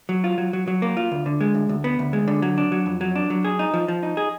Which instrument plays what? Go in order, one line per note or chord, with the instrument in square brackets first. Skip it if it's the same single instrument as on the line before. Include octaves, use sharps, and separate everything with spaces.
[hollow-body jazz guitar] F#3
F4
F#3
F#3
F#3
A#3
F4
D2
D3
G#3
D2
D2
B3
D2
G#3
D3
F#3
D4
F#3
F2
F#3
D4
F#3
G#4
D#4
F3
F3
D#4
G#4